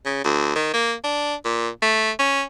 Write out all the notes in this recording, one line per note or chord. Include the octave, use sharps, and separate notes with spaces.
C#3
D2
D#3
A#3
D4
A#2
A3
C#4